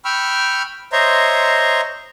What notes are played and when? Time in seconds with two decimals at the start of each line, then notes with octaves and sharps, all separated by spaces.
0.05 G5 B5 C#6 E6 F6
0.92 C5 C#5 D#5 E5 A#5 C6